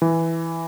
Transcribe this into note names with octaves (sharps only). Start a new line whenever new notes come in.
E3